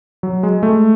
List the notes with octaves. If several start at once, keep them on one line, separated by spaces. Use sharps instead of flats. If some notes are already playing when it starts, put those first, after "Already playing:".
F#3
G#3
A3